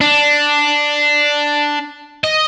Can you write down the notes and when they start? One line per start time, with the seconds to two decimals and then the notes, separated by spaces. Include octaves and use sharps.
0.01 D4
2.24 D#5